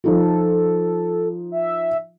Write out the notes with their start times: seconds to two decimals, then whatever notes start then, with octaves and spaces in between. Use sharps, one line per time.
0.04 F3 D#4 F4 A4
1.52 E5